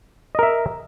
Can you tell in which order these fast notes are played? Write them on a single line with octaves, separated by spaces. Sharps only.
D#5 A#4 E5